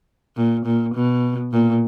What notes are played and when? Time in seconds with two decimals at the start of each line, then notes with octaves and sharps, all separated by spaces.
0.37 A#2
0.65 A#2
0.95 B2
1.52 A#2